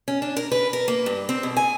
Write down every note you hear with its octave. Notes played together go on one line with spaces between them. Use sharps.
C#4
D4
A#4
B4
A#4
A#3
G2
C4
B2
G#5